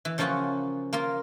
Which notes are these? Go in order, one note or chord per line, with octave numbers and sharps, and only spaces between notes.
E3
C#3 F3 A#3 C#4 F4 F#4
A#3 F4 A#4